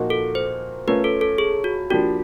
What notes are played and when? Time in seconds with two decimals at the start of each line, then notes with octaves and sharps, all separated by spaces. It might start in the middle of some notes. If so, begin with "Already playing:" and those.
Already playing: A#2 F3 A#3 D#4 F#4
0.10 A4
0.35 C5
0.87 A3 C#4 F4 A#4 B4 C#5
1.04 A4
1.21 A4
1.38 G#4
1.64 F#4
1.90 F3 A#3 D4 F#4 G4